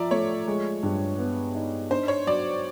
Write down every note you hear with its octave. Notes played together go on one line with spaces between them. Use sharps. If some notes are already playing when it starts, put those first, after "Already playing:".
Already playing: F3 D5 E5 A#5
A3 C#5
G#3
G2
B3
D#4
D4 C5
C#5
F#3 D5